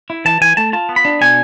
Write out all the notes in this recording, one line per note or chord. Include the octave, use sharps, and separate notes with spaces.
E4
E3 A5
E3 G#5
A3 A5
F4 A5
B3
B5
D4
B2 G#5